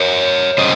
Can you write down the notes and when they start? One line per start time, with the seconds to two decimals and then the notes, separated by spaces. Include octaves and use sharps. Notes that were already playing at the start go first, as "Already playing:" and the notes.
Already playing: A#4 C#5
0.58 C3 G3 C#4 C5 D#5